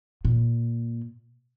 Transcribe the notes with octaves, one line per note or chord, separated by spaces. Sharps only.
A#2